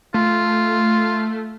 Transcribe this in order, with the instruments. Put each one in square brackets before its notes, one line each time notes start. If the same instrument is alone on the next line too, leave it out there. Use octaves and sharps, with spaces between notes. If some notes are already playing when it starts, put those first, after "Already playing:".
[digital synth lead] A3 [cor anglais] F4